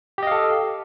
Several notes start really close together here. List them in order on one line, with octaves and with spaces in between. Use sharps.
G4 D#5 F5 A4